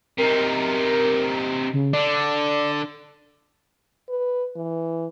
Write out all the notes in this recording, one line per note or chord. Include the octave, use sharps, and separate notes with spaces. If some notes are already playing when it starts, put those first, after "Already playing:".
C3 D#4 A#4
C#3
D3 D4 D5
B4
E3